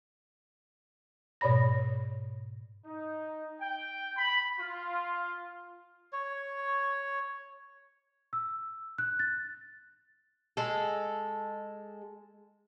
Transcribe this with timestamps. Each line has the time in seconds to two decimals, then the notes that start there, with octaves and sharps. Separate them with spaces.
1.41 G#2 B2 C#5 D5 B5 A#6
2.85 D#4
3.61 G5
4.17 B5
4.60 F4
6.13 C#5
8.33 E6
8.98 F#6
9.19 A6
10.57 G#3 A4